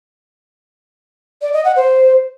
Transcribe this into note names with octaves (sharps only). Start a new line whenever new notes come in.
D5
D#5
F#5
C5